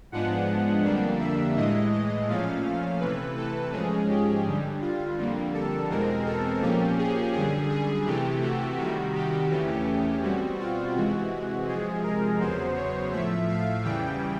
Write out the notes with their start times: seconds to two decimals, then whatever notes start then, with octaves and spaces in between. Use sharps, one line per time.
0.12 G#2 F3 G#3 B3 D4 F#5
0.83 F2 D3 G3 A#3 D4
1.20 E5
1.55 A2 E3 G#3 D#5
1.92 D#5
2.28 A#2 F3 A3 C#4 F5
3.00 C3 E3 A3 B4
3.37 A4
3.72 G#2 F3 G#3 C#4 G#4
4.09 G4
4.46 G2 D3 G3
4.81 F4
5.17 F2 D3 G3 A#3
5.54 A4
5.89 E2 B2 G#3 C4 A#4
6.26 A4
6.62 A#2 F3 A#3 C#4 G4
6.98 G#4
7.34 F#2 D3 G3 G#4
7.70 G#4
8.06 C3 E3 A3 G4
8.42 F#4
8.78 C3 D#3 G3 F#4
9.15 G4
9.51 E2 C#3 E3 A3 C#4
10.22 B2 G3 C4 F#4
10.59 F4
10.95 C3 E3 G#3 F#4
11.67 C3 F3 G#3 G#4
12.04 A#4
12.40 E2 C#3 F#3 B3 C5
12.75 C#5
13.12 A2 F3 A3 E5
13.48 F5
13.84 E2 C#3 E3 G3 G5